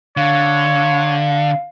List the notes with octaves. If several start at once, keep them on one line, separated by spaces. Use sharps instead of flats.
D3 C#5 F5